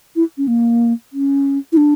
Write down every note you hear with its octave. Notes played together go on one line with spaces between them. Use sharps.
E4
C#4
A#3
C#4
E4
D4